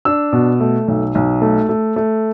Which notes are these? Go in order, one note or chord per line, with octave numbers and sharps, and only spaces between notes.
D4 E6
B2
A3
B1
B1
A3
A3
A3